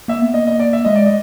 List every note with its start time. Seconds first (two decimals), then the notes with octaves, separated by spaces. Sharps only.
0.08 A#3 E5
0.21 B3
0.34 A#3 D#5
0.47 D#5
0.60 D5
0.73 E5
0.84 G#3 D#5
0.95 D5
1.06 D#5